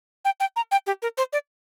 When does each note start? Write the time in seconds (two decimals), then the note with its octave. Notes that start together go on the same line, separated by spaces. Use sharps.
0.25 G5
0.40 G5
0.56 A#5
0.71 G5
0.86 G4
1.02 A#4
1.17 C5
1.33 D5